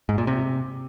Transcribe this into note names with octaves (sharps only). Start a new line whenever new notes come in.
G#2
A#2
C3